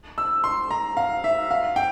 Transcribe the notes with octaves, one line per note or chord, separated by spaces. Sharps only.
E6
C6
A#5
F5
E5
F5
G5